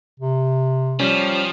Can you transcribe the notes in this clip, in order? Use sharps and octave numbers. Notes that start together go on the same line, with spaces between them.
C3
F3 G3 C#4